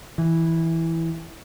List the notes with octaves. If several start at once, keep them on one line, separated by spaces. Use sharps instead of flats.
E3